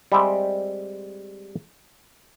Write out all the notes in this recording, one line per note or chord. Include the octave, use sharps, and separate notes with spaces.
G3 G#3 C4 E5 G5